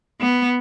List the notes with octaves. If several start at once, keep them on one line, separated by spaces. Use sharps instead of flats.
B3